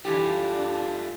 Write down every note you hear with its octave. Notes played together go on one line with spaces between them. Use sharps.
E3 G3 A3 D4 F4 G4